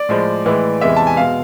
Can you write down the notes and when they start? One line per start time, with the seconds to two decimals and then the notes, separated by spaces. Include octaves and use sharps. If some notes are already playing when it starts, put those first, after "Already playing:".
Already playing: D5
0.09 A2 F3 G#3
0.46 A2 E3 G#3
0.81 E2 C3 E3 G#3 E5
0.96 A5
1.07 G#5
1.17 B2 G#3 F5